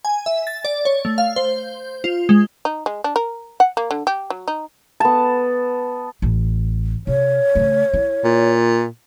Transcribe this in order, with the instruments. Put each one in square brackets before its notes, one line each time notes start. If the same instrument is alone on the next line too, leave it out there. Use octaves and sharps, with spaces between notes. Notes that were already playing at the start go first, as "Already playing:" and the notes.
[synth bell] G#5
E5
A6
D5
C#5
A3
F5
C5
F4
G#3
[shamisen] D#4
G#3
D4
A#4
F#5
A#3
D3
G4
F#3
D#4
[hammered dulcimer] B3 A5
[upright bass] A1
[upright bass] C3 [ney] C#5
[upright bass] C#3 A3
E4
[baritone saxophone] A#2